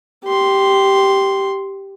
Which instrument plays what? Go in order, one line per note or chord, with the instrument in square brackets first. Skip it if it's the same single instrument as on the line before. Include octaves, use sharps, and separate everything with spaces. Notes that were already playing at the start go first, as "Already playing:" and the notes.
[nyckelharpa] G4 C6